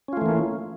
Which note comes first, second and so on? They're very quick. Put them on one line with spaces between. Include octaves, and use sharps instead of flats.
C#4 F4 A3 E3 A#3